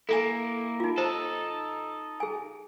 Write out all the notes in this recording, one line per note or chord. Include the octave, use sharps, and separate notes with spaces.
A#3 E4 A4 G#5
D#4 F4
D#4 A4 C5
G#4 G#5